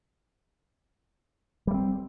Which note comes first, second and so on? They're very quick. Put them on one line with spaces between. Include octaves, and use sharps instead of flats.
G3 A3 C4